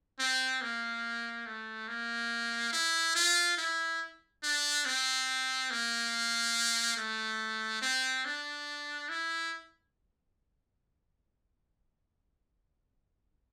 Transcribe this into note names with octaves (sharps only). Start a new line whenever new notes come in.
C4
A#3
A3
A#3
E4
F4
E4
D4
C4
A#3
A3
C4
D4
E4